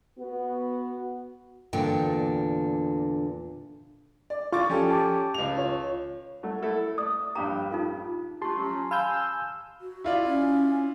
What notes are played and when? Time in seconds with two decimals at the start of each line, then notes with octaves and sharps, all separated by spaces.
0.19 B3 F#4
1.73 E2 A#2 D3 G5
4.30 D5
4.53 F4 C#6 D6 A6
4.70 F3 C#4 G4 A4
4.91 A5 D6
5.34 C#2 F7
5.57 F4 C#5
6.43 F#3 A3
6.62 A3 E4 A4
6.98 D5 D#6
7.35 A#1 G2 G4 A#5
7.71 D#4 F4 A4
8.42 A3 D4 F4 G4 A5 C6 C#6
8.57 F#3 C#4
8.91 F5 G#5 B5 E6 G6
9.81 F#4
10.04 E4 F4 D5
10.27 C#4